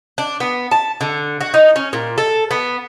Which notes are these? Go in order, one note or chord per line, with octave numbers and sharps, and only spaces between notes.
D4
B3
A5
D3
F#4
D#4
C#4
A#2
A4
B3